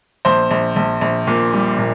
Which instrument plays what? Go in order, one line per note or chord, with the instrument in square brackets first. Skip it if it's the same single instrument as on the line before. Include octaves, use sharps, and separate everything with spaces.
[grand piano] A#1 C5
A#1
A#1
A#1
A#2
G3
A#2